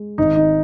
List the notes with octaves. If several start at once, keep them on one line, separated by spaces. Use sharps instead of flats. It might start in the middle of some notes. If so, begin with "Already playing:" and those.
Already playing: G#3
G#1 D#4
D#4